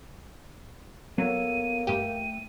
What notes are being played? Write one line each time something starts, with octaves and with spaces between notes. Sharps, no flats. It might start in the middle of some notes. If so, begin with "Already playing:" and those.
F#3 A#3 B3 A4 C#5 D#7
G2 A3 G4 G5 D#7